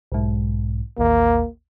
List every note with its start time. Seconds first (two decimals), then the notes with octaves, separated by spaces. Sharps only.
0.12 B1 G#2
0.98 A1 D#2 A#3